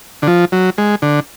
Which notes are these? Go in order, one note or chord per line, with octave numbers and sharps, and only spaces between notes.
D3
F3
F#3
G#3
D3